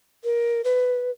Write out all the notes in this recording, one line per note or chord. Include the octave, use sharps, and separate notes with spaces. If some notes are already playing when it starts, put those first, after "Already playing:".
A#4
B4